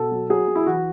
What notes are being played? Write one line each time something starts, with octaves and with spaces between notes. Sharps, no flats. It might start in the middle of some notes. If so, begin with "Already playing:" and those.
Already playing: B2 A4
F#3
F#3 G#4
F#3
E4
E3 F#4